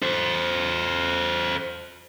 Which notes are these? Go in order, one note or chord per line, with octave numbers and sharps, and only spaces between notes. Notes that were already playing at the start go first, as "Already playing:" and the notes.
A4 C5